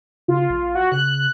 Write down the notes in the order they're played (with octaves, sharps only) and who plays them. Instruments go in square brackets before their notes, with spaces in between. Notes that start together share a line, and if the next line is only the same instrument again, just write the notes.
[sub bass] C#3 [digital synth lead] F4
[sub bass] A#1
[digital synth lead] F#4
[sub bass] C#3 [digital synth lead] F#6